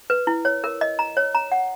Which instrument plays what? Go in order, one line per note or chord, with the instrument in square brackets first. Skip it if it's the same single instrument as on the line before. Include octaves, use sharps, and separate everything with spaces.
[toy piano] B4
E4
C#5
A#4
D#5
A#5
C#5
A#5
F#5